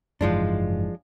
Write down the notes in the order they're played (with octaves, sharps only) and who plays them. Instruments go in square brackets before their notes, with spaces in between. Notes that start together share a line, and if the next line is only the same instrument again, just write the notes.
[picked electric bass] F#1 G#2 E3 [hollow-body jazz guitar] F3 G#3 D4